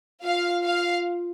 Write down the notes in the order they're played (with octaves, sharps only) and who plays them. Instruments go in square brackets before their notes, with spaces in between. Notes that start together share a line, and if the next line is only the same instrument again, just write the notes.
[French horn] F4 [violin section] F5
[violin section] F5